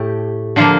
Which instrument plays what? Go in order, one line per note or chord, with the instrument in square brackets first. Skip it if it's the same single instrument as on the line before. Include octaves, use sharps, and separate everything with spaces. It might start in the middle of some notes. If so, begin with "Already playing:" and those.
Already playing: [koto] A2 A3 G4
D3 F3 A#3 F4